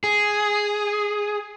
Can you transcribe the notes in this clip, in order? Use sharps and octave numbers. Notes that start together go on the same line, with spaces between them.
G#4